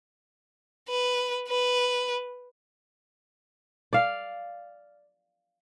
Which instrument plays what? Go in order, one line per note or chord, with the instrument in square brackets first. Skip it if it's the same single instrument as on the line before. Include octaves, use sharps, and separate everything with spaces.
[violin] B4
B4
[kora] D5 F5